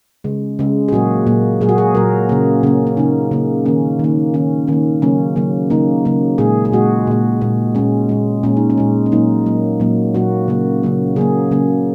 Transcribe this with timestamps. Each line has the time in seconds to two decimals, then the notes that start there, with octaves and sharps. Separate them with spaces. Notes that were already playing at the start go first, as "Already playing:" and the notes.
0.24 C#3 G#3
0.59 C#3 G#3
0.88 G#4
0.92 A#2 F#3 A#3 F#4
1.27 A#2 F#3 A#3
1.61 A#2 F#3 A#3 G#4
1.69 F#4
1.78 G#4
1.95 A#2 F#3 A#3 A#4
2.29 C#3 A#3
2.63 C#3 A#3 C#4
2.87 C#4
2.97 C#3 A#3 D#4
3.31 C#3 A#3
3.66 D#3 A#3 C#4
3.99 D#3 A#3
4.34 D#3 A#3 C#4
4.67 D#3 A#3 C#4
5.02 C#3 F#3 A#3 C#4
5.36 C#3 F#3 A#3
5.70 C#3 F#3 A#3 D#4
6.05 C#3 F#3 A#3
6.38 A#2 G#3 G#4
6.65 G#4
6.72 A#2 G#3 F#4
7.07 A#2 G#3
7.41 A#2 G#3
7.75 A#2 G#3 C#4
8.09 A#2 G#3
8.43 A#2 G#3 C#4
8.57 D#4
8.70 C#4
8.78 A#2 G#3
9.06 C#4
9.12 A#2 F#3 A#3 D#4
9.46 A#2 F#3 A#3
9.80 A#2 F#3 A#3
10.14 A#2 F#3 A#3 F#4
10.48 C#3 F#3 A#3
10.83 C#3 F#3 A#3
11.16 C#3 F#3 A#3 G#4
11.51 C#3 F#3 A#3